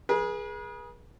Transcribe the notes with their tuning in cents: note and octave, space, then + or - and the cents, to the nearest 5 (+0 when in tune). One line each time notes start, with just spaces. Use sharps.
G#4 +0 B4 -45